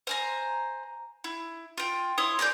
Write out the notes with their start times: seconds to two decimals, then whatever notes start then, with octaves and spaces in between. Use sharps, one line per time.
0.07 C5 G#5 A#5
1.24 E4
1.78 F4 G5
2.18 E4 C#5 C6 D#6
2.39 A#3 G#4 D5 G6